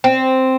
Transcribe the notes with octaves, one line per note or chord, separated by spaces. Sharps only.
C4